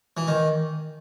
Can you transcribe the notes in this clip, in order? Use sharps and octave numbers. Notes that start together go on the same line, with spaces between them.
E3
D#3